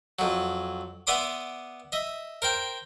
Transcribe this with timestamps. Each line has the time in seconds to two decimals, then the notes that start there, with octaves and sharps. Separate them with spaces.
0.19 F2 F#3
1.07 B3 D5 E5 C6 D6 D#6
1.92 D#5 E5
2.42 A#4 C5 G5